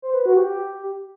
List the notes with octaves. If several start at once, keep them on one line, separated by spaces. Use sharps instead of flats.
C5
B4
F#4
G4